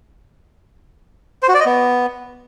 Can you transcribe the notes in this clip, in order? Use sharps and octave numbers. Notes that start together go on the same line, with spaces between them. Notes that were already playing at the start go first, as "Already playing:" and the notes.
C5
F#4
D5
D#5
B3